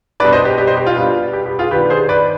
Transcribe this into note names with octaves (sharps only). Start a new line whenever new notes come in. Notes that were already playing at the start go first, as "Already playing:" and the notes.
B2 G3 D4 B4 D5
C5 D#5
G4
G4
C5 D#5
G4
F4
B2 G3 B3 D4
G4
G4
F4 G#4
D#3 B3 D4 G4 B4
G#4 C5
B4 D5